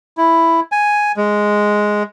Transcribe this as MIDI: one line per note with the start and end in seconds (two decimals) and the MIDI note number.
0.17 0.60 64
0.72 1.12 80
1.17 2.03 56